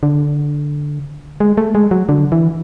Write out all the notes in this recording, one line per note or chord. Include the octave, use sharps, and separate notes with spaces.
D3
G#3
A3
G#3
F#3
D3
E3